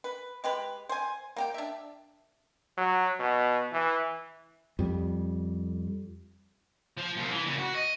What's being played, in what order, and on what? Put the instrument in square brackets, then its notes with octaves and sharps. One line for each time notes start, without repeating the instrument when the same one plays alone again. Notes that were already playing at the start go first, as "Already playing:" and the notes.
[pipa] B4
G#3 G4 B4
C5 G#5
A#3 G4 G5
D4 E5
[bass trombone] F#3
B2
E3
[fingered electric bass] F2 G3
[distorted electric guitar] F3
C2 A#2
E3
A#2 C#3
F#4
D#5